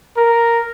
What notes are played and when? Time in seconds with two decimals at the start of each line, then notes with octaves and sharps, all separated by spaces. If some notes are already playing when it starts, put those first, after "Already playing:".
0.17 A#4